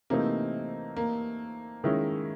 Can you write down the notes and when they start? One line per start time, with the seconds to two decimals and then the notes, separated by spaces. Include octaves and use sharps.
0.10 C3 E3 A3 A#3 C4 D#4
0.96 A#3
1.84 D#3 G#3 C#4 E4